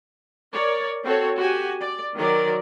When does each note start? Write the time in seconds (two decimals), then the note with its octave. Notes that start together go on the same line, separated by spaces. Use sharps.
0.51 A#4 C#5 D5
1.04 C4 F#4 A4 C#5
1.37 F#4 G4 G#5
1.81 D5
2.15 D#3 F#3 A#4 D5